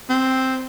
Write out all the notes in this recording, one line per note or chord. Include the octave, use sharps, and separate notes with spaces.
C4